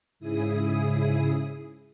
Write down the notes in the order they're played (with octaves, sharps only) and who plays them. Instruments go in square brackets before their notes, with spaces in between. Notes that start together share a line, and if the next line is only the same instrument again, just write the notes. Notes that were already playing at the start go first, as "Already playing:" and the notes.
[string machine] G#2 C#3 E4 G#4 D#6